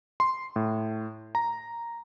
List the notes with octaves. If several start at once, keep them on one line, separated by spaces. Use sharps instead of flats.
C6
A2
A#5